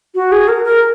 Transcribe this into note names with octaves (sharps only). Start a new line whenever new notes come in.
F#4
G#4
A#4
A#4